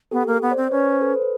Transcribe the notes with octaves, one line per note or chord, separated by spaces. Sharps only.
B3 G4 A4
A#3
B3
C5 D5
C4
C#4 B4 C#5
C5
A4 B4
B4